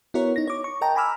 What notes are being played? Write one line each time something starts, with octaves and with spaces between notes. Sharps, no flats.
B3 E4 F#4 A#4 C#5
D#4 A#6
C#5 D6
C#6
A#4 D#5 G5 A5 A#5
G#5 A#5 B5 D6 E6 F6